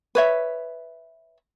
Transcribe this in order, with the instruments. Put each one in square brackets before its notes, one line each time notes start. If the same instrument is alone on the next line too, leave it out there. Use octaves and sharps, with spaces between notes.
[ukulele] B4 C#5 E5